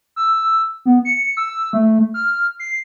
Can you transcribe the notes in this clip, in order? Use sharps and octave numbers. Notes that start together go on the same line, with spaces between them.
E6
B3
C#7
E6
A3
F6
C7